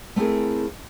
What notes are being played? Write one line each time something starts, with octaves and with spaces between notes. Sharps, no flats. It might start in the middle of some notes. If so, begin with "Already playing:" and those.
A3 C4 E4 G#4 A#4